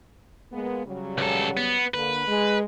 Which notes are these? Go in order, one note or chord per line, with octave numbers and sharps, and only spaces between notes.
G#3 A#3 B3
C#3 F#3 G3
C#2 A4
B3
D3 A#3 B4
G#3